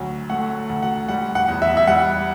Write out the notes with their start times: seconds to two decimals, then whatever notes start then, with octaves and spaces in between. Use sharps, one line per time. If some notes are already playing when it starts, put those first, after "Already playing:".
Already playing: D2 F#3
0.30 A3 F#5
0.69 D2
0.83 F#5
1.08 G3 F#5
1.35 F#5
1.48 E2
1.62 E5
1.77 E5
1.87 G3 F#5